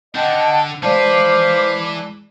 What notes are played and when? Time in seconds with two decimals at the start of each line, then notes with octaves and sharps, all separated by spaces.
0.15 D3 D#5 F#5 G5 A5 G6
0.83 E3 G#3 B4 C5 D5 F5 A5 D6